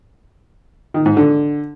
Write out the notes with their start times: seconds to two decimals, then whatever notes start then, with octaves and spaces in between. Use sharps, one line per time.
0.94 D#3
1.06 G#2
1.17 D3